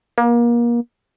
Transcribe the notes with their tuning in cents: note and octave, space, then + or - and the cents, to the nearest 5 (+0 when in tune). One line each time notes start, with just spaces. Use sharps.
A#3 +30